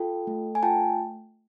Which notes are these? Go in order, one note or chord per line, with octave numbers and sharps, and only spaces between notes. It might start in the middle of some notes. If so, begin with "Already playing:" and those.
Already playing: F4 A4 G5
A3
G#5
F4 G5 A5